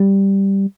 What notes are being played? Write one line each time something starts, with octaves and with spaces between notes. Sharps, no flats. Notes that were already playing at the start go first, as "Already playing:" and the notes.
Already playing: G3